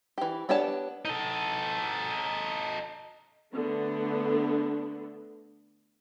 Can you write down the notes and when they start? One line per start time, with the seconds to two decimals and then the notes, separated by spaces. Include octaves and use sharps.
0.18 E3 G4
0.49 B3 D4 G4 C#5 A5
1.05 D#4 A4
3.53 D3 A3 B3 D4